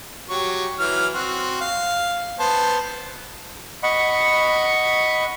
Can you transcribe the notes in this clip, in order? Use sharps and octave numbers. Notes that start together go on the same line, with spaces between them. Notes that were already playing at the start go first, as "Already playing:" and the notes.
F#3 G4 C#6
E3 F#3 F6
C4 F#4
F5
B3 C5 A5
D#5 F#5 B5 C#6